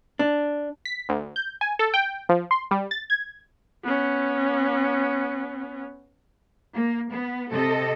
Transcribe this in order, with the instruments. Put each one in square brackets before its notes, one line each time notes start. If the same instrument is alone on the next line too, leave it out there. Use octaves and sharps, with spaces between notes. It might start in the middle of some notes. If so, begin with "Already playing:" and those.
[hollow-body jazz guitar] D4
[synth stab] B6
D2
G6
G#5
A4
G5
F3
C6
G3
A6
G#6
[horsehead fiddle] B3 C#4
[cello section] A#3
B3
C3 A4 D#5